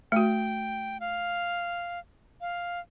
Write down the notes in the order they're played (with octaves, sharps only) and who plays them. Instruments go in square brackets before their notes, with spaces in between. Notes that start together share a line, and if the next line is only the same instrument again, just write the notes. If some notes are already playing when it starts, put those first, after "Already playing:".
[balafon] A3 F#4 [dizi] G5
[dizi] F5
F5